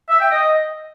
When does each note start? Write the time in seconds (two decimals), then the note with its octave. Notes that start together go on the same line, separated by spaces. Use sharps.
0.09 E5
0.20 G5
0.32 D#5